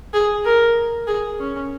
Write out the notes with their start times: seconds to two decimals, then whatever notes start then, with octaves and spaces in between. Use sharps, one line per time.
0.14 G#4
0.46 A#4
1.07 G#4
1.40 C#4